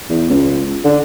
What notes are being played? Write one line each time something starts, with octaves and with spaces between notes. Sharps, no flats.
E2
C#2
D3